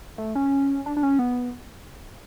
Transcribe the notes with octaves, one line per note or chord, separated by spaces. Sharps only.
A3
C#4
D4
D4
C#4
B3